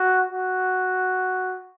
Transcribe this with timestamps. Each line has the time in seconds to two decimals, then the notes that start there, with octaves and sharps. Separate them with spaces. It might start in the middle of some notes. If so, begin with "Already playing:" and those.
Already playing: F#4
0.30 F#4